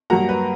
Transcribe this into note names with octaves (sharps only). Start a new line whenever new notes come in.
G2 F#3 A#3 F#5 A#5
B4